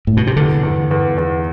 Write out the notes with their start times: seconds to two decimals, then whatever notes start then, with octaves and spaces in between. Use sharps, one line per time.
0.07 A2
0.17 B2
0.27 C3
0.36 E2 D3
0.63 E2
0.91 E2
1.18 E2